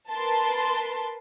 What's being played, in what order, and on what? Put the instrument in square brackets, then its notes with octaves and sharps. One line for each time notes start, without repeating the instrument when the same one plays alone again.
[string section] A#4 B4 A5 C6